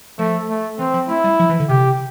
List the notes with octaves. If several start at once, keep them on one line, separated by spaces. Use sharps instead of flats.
F3 A3
A3
E3 C4
F3
A3 E4
G3
F3
E3
D3
C3 G4